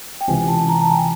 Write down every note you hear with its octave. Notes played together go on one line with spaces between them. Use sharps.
G5
C#2 C3 E3 G#5
A5
A#5
A5
G#5
G5